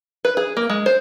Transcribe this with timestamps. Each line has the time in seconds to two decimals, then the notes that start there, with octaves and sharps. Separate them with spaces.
0.25 B4
0.37 G#4
0.57 A#3
0.70 G#3
0.86 C5